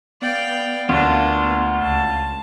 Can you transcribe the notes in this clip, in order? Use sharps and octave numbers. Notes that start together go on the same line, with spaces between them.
B3 D5 F5 G5
D2 A#3 D4 F4
C#2 A5